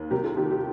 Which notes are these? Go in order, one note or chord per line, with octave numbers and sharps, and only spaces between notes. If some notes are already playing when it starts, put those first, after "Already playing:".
Already playing: D#2
C2 G4 A#4
F4 A4
D#3 G4
G4